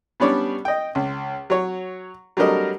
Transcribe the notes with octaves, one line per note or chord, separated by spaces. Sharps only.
G3 B3 C#4 D4 C#5 D5
D#5 G5
C#2
F#3 C#5
F#3 G3 A3 D4 A#4 D#5